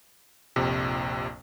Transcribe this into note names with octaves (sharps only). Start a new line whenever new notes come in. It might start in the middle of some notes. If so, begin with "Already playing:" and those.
A#1 F2 C3